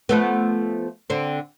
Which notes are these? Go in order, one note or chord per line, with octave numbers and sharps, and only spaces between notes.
F3 A3 B3
D3 C4